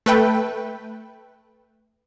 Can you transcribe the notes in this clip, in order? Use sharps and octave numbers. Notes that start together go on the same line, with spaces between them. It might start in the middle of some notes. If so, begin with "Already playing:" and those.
A3 B4 G5